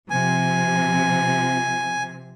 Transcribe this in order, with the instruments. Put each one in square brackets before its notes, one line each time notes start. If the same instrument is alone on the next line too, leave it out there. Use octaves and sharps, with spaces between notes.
[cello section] C3 F3 C4 [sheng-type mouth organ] G#5